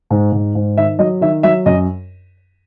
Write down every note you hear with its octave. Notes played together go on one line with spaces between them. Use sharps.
G#2
G#2
G#2
D#3 E5
F#3 D#5
D#3 E5
F#3 E5
F#2 D#5